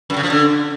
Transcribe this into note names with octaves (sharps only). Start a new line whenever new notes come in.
F#2
C#3
F3
D3